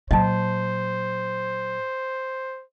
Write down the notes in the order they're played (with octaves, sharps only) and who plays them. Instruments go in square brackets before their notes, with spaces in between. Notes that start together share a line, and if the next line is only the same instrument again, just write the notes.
[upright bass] A#2 F#3 [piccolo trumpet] C5 [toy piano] D#5 G5 A5